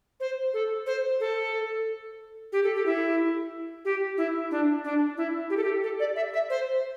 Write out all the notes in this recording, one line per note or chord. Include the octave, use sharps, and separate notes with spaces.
C5
A4
C5
A4
G4
A4
G4
E4
G4
E4
D4
D4
E4
G4
A4
G4
A4
D5
E5
E5
C5